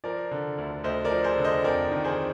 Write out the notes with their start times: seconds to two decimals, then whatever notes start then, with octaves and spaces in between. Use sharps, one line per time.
0.04 F3 A#4 D5
0.31 D3
0.58 D2
0.84 D2 C5 D#5
1.05 A#4 D5
1.11 F3
1.24 G#4 C5
1.38 D3
1.44 C5 D#5
1.64 F2 A#4 D5
1.91 D#3
2.05 G#4 C5